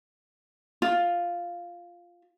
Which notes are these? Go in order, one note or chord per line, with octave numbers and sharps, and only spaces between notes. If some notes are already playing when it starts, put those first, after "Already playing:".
F4